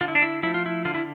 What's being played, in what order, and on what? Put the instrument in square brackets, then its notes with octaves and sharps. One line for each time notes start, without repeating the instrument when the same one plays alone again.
[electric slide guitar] D3 F4
E4
D4
E4
F3 A3 E4
F4
E4
D3 F4
E4